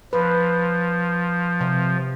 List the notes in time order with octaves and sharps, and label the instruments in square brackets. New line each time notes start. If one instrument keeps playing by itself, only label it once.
[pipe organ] F3 [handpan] B4
[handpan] C3